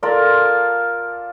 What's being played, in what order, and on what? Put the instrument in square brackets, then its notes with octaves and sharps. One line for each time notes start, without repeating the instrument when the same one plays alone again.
[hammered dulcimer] F4 A4 A#4 D5